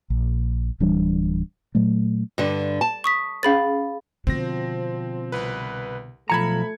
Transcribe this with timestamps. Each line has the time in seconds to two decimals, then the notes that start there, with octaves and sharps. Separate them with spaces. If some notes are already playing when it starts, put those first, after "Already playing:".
0.10 A#1
0.80 D1 E3 G3 D4
1.75 A#2 F#3 A3
2.38 G2 D3
2.81 A5
3.04 C#6 D#6 B6
3.43 C#4 G#4 C5 F5 B5 A6
4.27 B2 D3 F3 C4 A#6
5.32 C2 B4
6.30 B1 F3 A3 A#5 B5 G#6 C#7